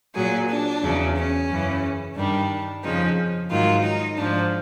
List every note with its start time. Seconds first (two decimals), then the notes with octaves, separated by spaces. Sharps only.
0.14 A#2 F#3 G#4
0.48 D4
0.81 E2 C#3 F#3
1.16 C#4
1.49 F#2 C#3 E3
2.16 G2 D#3 G3 D4
2.83 F2 C#3 F3 D#4
3.50 G#2 D#3 F#3 F4
3.83 D#4
4.17 G#2 F3 D4